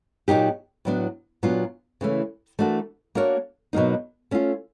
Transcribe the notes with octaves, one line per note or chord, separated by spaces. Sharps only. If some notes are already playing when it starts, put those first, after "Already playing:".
A#2 F#3 A#3 D#4 G4
A2 F#3 B3 D4
A#2 F#3 B3 D4 F4
C#3 E3 A3 C#4
E3 A3 D4 F#4 A#4
A#3 D4 F#4 A#4 C#5
B2 F#3 A#3 D#4
A3 C#4 F4